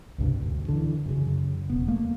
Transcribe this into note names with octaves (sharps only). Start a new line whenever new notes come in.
C#2 G2 C3
D2
D3 E3
F#2 C#3
E1 B3
A3 A#3